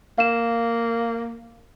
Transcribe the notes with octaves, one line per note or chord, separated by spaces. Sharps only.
A#3 F5 E7